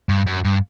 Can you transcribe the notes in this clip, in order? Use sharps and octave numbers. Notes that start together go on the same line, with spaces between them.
G2
F#2
G2